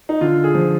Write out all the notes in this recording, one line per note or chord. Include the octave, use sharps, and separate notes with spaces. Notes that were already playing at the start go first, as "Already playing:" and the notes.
D#4
D3 F4
G#4
F3